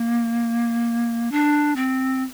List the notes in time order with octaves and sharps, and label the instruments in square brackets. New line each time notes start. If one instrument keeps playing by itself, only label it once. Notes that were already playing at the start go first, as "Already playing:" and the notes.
Already playing: [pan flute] A#3
D4
C4